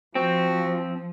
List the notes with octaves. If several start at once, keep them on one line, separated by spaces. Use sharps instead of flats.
F3 C4 F#4